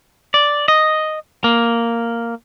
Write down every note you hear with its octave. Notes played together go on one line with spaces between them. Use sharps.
D5
D#5
A#3